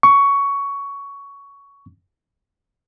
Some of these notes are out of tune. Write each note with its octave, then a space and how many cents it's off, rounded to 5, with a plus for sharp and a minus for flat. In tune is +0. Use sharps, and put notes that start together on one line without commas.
C#6 +15